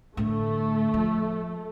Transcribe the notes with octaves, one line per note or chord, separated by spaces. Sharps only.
A2 D3 A3
F3